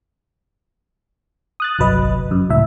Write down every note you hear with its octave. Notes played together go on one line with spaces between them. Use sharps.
D#6 F#6 A6
G1 C2 F#3 B4 D#5
F#2
C#2 A2 E5